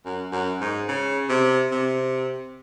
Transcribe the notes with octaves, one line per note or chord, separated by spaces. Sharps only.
F#2
F#2
G#2
C#3
C3
C3